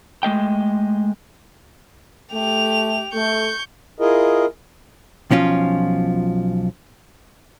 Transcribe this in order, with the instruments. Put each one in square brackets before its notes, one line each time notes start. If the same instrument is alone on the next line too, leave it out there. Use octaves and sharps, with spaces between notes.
[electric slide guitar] G#3 A3 D#5 G5
[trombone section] A3 [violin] G4 F7
[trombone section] A3 [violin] C#6 G6
[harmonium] E4 F4 G#4 A#4 D#5
[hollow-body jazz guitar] B1 F3 C#4 F4